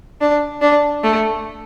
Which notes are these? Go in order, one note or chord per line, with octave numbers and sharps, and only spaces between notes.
D4
D4
A3